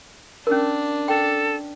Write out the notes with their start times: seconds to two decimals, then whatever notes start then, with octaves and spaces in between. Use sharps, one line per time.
0.47 C#4 D4 A#4
1.08 A4 G5